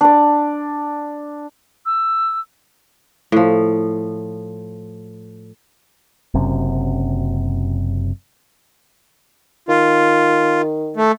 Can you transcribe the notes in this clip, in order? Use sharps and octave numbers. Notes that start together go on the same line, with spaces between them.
D4 D5
E6
A2 F3
F#1 F#2 C3
D#3 F4
A3